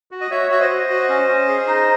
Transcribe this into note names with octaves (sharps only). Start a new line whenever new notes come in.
F#4
D#5
F#4 C#5 E5
F#4 E5
C5 D#5
F#4
F#4
C#4
C#4
G#4
D#4